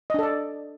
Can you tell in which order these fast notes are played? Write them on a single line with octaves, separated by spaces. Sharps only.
D#5 D4 A4 D5